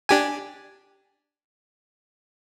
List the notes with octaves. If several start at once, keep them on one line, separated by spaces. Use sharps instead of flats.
D4 G4 G#5